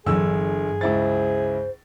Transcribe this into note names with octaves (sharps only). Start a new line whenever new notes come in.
G1 G2 D3 E3 F#3 G#4 E6
C#2 E4 C5 A6